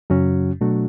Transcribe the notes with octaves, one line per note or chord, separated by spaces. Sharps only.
F#2 C#3 F#3 C#4 F#4
B2 F#3 A3 D4 F#4